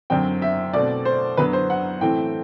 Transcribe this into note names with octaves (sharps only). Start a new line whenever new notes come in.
F#2 D3 F#3 C4 G5
E5
B2 A3 C4 D5
C5
F#2 D3 F#3 B3 B4
C5
F#5
A2 E3 A3 C4 G5